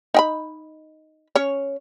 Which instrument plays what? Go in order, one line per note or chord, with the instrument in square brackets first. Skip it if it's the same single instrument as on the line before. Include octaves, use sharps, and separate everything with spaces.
[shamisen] D#4 G5 B5
C#4 C#5